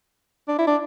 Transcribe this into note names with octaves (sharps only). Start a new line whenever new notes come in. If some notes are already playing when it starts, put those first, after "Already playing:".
D4
E4
D4